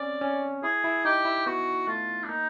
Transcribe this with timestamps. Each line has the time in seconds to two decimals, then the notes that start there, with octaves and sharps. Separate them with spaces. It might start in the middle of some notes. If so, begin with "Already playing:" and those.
Already playing: C4 C#4 D5
0.21 C#4
0.63 E4 G#4
0.84 E4
1.05 D#4 G4
1.25 E4
1.46 B3 F#4
1.87 A3 F4
2.24 D4
2.29 A#3 D#4